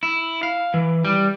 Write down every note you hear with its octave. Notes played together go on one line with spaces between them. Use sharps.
E4
F5
E3
G3